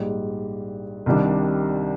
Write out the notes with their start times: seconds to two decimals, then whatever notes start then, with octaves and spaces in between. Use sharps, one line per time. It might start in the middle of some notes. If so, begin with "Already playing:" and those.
Already playing: A#1 G#2 G3
1.06 C2 C3 D#3 G3 D4